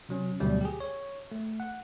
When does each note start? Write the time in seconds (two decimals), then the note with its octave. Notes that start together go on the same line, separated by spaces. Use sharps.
0.09 C3 F#3 C#4
0.40 D2 B2 D3 F#3 G3
0.61 G4 G#4
0.80 C#5
1.32 A3
1.60 F#5